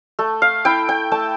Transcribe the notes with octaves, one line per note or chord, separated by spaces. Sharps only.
A3
F5
E4 G5
G5
A3 A5